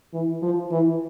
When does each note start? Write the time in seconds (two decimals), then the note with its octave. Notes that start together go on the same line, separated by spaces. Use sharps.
0.14 E3
0.42 F3
0.71 E3